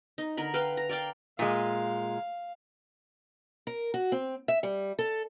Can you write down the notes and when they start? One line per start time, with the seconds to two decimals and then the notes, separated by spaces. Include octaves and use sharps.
0.18 D#4
0.37 D3 A#4 B5
0.54 B4 F5 G5 B5
0.77 A#5
0.89 A#4 D5 F5 G5
1.39 A#2 G#3 F5
3.67 A#4
3.94 F#4
4.12 C4
4.48 E5
4.63 G3
4.99 A4